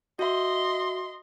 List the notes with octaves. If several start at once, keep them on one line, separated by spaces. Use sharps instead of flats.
F#4 D#5 E5 C6